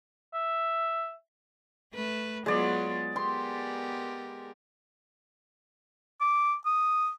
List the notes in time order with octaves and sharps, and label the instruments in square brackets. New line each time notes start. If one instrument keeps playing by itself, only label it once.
[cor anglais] E5
[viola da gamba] A3 B4
[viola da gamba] F#3 B3 F4 [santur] G#3 D5
[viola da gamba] B3 G4 A#4 [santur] C6
[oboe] D6
D#6